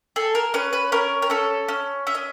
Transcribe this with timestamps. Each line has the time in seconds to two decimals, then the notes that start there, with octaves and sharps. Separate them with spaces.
0.16 G#4 A4
0.35 A#4
0.54 C#4 B4
0.73 B4
0.92 C#4 A#4
1.22 A#4
1.30 C#4 A4
1.68 C#4
2.07 C#4 E5
2.15 D#5